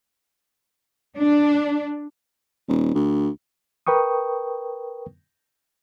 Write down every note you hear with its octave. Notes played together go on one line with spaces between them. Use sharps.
D4
D#1
D2
A#4 B4 G5 C#6 D#6